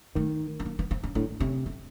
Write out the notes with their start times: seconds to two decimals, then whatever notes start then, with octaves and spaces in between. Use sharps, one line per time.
0.15 D#3 A3
0.60 B3
0.65 A#3
0.79 B3
0.91 C4
1.03 C#4
1.15 A2 D4
1.40 C3 C#4
1.66 C4